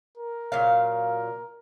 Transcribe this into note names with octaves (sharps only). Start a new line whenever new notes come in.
A#4
A#2 F#3 F5